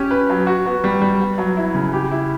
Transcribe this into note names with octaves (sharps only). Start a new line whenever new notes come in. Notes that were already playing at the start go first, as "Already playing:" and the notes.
Already playing: C#4 G4
B4
F#3
F#4
B3
G3
G3
B3
F#3
E4
C#3
G4
E4